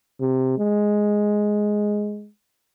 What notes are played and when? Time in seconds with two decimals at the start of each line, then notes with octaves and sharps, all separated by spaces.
0.20 C3
0.59 G#3